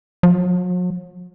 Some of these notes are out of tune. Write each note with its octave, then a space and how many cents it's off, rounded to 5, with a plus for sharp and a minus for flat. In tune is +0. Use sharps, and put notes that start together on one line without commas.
F#3 -45